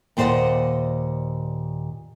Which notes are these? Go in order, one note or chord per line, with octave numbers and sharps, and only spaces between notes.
D#2 A#2 C5 D5 D#5 F#5